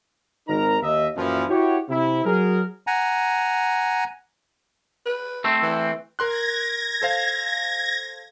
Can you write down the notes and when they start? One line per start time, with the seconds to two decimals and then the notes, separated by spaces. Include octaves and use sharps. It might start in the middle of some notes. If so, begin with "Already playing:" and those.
0.48 G#1 D#4 A#4 A#5
0.83 D#2 D#5 E5
1.17 F#2 A#2 E3 F3
1.49 E4 F#4 G4 C#5
1.89 C3 E4
2.25 F#3 G#4 A#4
2.87 F#5 G#5 A#5
5.06 B4
5.44 A3 C4
5.63 E3
6.19 A#4 C6 F#6 G#6 A#6
7.02 A4 C5 F5